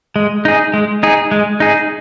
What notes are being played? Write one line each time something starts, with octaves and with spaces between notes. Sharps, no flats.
G#3
D#4 G#4
G#3
D#4 G#4
G#3
D#4 G#4